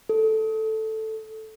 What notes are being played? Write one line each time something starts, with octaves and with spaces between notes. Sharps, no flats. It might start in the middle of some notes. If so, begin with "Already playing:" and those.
A4